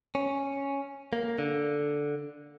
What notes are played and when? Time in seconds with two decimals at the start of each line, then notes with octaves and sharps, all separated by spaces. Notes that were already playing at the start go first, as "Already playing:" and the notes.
0.15 C#4
1.13 A#3
1.38 D3